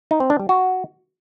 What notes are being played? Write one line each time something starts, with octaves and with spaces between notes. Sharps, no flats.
D#4
C4
D4
G3
F#4